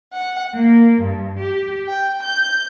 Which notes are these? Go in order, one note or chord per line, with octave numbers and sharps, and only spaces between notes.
F#5
A#3
G2
G4
G5
G6